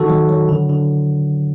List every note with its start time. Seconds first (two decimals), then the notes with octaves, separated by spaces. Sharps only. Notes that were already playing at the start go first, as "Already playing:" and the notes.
Already playing: D#3 F#4 A4
0.10 F#3
0.29 F#3
0.49 D3
0.69 D3